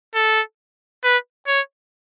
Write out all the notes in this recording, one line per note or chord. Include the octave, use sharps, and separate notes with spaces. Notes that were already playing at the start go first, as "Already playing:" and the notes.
A4
B4
C#5